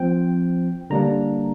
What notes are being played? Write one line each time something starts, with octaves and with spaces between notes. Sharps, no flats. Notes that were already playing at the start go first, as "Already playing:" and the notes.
Already playing: F3 C4 G5
D3 G3 A#3 D4 A#5